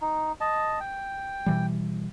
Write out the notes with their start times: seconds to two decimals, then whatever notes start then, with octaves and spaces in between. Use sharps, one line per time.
0.02 D#4
0.40 D#5 A5
0.80 G5
1.46 B2 E3 G3